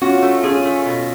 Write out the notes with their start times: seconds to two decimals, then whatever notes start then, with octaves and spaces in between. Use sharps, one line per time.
0.02 C#4 F4 F#4
0.22 A3
0.43 C#4 F4 G#4
0.65 A3
0.85 B2